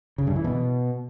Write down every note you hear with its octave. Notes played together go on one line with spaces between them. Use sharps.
C#3
G2
E3
B2